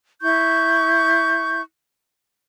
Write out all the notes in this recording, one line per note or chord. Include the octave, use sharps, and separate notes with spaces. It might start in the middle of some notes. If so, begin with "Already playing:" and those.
E4 C#6 G6